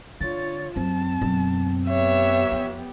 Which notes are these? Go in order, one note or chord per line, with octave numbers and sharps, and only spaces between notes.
D3 F4 C#5 A6
F#2 C4 A5
F#2 B2
B3 G4 C#5 E5
F2